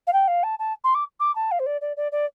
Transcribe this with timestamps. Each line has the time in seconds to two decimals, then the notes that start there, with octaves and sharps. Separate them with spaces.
0.07 F5
0.13 G5
0.28 F5
0.43 A5
0.59 A5
0.84 C6
0.95 D6
1.20 D6
1.35 A5
1.51 F5
1.59 C5
1.66 D5
1.81 D5
1.97 D5
2.12 D5